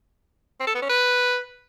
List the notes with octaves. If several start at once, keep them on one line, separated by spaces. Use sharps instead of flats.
C4
A4
B3
C#4
B4